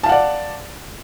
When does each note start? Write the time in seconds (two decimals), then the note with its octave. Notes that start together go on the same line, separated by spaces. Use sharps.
0.03 A5
0.06 F5
0.09 F#5
0.12 D5